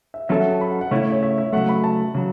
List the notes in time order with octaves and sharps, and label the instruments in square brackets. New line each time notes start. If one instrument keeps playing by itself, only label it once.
[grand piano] E5
[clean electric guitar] F#3 C#4 A4 [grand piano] E5
[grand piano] F#5
A5
B5
F#5
F#5
[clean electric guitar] C#3 A3 C#4 E4 [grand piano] C#5
[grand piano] C#5
C#5
E5
E5
[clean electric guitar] C#3 F#3 A3 [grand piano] F#5
[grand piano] B5
A5
[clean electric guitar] C#3 F#3